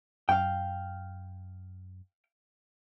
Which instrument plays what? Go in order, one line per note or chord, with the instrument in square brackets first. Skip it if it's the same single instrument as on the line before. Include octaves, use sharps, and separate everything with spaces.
[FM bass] F#2 [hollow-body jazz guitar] F5 G5